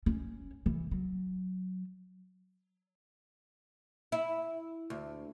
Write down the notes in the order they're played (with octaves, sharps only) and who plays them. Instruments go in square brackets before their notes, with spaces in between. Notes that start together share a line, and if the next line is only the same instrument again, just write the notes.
[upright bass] C#4
E3
F#3
[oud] E4
D2